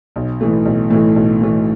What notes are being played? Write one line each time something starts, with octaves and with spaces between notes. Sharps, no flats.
B1
A2 E3 A3
B1
A2 E3 A3
B1
A2 E3 A3